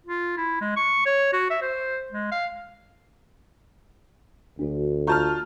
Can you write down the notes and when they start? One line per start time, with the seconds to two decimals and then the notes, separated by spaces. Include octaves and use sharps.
0.06 F4
0.37 E4
0.61 G#3
0.76 C#6
1.06 C#5
1.33 F#4
1.50 E5
1.62 C5
2.12 G#3
2.31 F5
4.59 D2 D4 F#4 A4
5.07 F4 A5 A#5 C#6 F6 G6